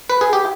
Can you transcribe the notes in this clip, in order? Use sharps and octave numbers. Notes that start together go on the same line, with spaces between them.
B4
G#4
G4